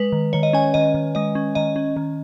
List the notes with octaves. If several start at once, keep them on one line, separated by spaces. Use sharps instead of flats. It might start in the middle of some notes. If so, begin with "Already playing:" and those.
Already playing: G#3 B4
D#3
D#3 C#5
D#5
C#4 G#5
D#3 D#5
D#3
G#3 D#5
C#4
D#3 D#5
C#4
D#3